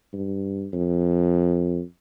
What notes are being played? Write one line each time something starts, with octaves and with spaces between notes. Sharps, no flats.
G2
F2